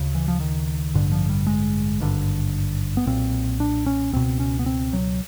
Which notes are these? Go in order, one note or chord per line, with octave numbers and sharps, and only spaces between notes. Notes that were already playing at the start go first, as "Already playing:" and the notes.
Already playing: D2 C#3
E3
F3
D#3
A1 G2 D3
F3
G3
G#3
G#1 G2 D3
B3
B1 A#2 C4
D4
C#4
C#2 B2 C4
C#4
B3
C4
F#3